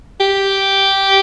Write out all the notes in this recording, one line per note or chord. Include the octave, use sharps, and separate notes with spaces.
G4